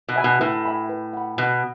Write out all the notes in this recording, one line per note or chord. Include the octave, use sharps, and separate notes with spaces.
B2
E5 G#5 B5
B2
A2 B4
E5 G#5 B5
B4
F#5 B5
B2 B4